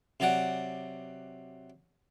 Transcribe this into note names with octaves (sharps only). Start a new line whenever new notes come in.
C3 F#3 D5 F#5